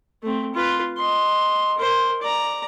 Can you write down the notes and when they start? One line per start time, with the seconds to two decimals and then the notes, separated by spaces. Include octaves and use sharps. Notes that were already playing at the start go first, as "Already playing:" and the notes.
0.23 A3 C4
0.54 F4 B4
0.97 D#5 C6
1.78 A#4 C5
2.21 D5 A#5